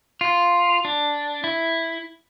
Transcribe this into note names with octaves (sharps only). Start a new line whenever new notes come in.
F4
D4
E4